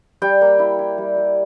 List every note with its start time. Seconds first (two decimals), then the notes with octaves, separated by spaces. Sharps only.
0.22 G3 G5
0.41 A#3
0.59 E4
0.79 E4
0.98 G3
1.17 G3